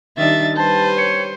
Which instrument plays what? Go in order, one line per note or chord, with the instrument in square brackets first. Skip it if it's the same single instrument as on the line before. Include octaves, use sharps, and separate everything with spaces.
[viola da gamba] D#3 G3 D4 [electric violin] E5 A6
[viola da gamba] G3 B4 [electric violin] C5 [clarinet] A5
[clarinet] C#5